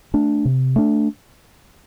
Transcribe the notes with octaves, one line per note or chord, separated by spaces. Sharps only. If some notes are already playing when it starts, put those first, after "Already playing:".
A3 D4
C3
A3 D4